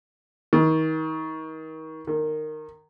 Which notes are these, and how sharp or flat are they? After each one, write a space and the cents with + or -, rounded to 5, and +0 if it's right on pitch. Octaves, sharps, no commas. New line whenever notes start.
D#3 +35
D#3 -15